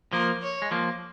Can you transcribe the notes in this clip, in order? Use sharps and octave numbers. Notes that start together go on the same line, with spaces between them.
F3 A#3 A#4
C#5
G#3
F3 A#3